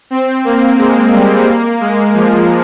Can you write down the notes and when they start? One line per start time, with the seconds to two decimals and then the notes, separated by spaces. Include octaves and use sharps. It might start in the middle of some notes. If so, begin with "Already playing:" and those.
0.10 C4
0.45 A#3
0.78 G#3
1.12 G3
1.46 A#3
1.80 G#3
2.14 F3